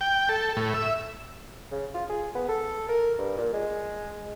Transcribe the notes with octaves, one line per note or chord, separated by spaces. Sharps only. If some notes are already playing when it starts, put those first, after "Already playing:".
G5
A4
A2
E5
C#3
F4
G#4
B3
A4
A#4
G2
A#2
G#3